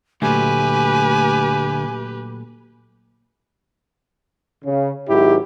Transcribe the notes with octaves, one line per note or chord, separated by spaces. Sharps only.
D2 A#2 F#3 A3 G4 B4 G#5
C#3
G#1 G#2 F#3 E4 G4